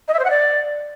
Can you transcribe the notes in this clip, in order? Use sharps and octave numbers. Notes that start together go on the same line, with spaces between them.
D#5
E5
C5
F#5
D5